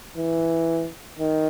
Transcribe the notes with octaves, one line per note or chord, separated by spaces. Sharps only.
E3
D#3